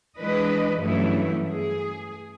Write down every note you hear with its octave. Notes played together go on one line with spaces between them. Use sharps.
E3 G#3 D4 B4 D#5
G2 E3 F#3 A3 C#4 E4
G#4